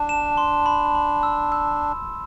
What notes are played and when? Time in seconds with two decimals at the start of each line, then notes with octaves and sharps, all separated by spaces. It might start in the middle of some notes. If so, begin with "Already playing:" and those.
Already playing: D4 A5
0.09 E7
0.37 C6
0.66 B5
0.95 B5
1.23 E6
1.52 E6